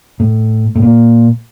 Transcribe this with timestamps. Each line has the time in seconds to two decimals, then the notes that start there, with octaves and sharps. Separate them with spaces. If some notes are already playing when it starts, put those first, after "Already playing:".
0.20 A2
0.75 A2
0.82 A#2